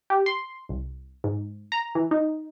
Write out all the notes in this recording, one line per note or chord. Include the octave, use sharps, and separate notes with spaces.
G4
C6
C2
G#2
A#5
E3
D#4